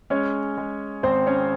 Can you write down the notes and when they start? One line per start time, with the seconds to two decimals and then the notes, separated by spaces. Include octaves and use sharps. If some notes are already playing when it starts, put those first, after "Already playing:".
0.10 G#3 C#4 C#5
0.57 G#3
1.03 G#1 C4 C5
1.27 C#4 C#5